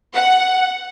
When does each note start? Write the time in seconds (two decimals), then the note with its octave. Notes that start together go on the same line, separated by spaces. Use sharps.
0.14 F#5